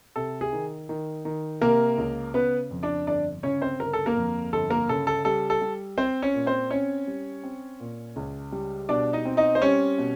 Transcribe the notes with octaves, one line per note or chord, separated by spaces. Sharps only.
C3 A4
G#4
D#3
D#3
D#3
C3 A#3 A#4
C#2
C#3 B3 B4
F2
D4 D5
G1 D4 D5
C#3 C#4 C#5
C4 C5
G1 A#4
A4
A#3 A#4
F2
G1 A4
A#3 A#4
C#3 A4
A4
G3 A4
A4
G3
C4 C5
C#4 C#5
A#2
C4 C5
C4 C#4 C#5
G3
C4
A#2
C#2
G3
B2 D4 D5
D#4 D#5
C4
D#4 D#5
C5
G3 C#4 C#5
B2